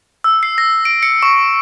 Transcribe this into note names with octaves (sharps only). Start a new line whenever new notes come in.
E6
C7
A#6
D7
C#7
C#6